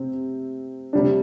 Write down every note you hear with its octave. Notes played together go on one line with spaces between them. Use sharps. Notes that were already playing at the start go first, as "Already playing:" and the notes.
Already playing: C3 C4
C3 G3 D4